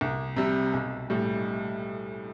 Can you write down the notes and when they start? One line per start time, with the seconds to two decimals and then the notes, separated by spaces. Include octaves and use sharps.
0.01 C2
0.36 C3 G3
0.73 B1
1.10 A2 G3